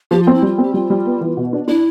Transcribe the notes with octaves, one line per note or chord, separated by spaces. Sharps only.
F3 G4
C4 F4
E4
G3 F4
C4 G4
G3 F4
G3
B3
E3
B2
D4
D4 E4